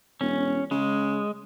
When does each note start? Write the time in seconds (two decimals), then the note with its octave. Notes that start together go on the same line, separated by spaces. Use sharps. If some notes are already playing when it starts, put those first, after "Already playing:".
0.21 E1 C#4
0.71 C#3 G#3